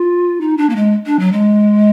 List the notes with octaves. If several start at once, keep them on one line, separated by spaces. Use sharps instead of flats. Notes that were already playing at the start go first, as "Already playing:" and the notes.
Already playing: F4
D#4
D4
A#3
G#3
D4
F#3
G#3